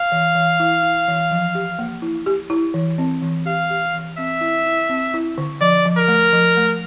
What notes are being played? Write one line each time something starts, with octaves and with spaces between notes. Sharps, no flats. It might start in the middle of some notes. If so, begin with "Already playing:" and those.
Already playing: F5
E3
E3
E4
E4
E3
F3
G4
A#3
E4
G4
E4
E3
C4
E3
G4 F5
G4
E3
C4 E5
E4
E4
C4
E4
D3
F3 D5
F3
A#4
A3
F3
A3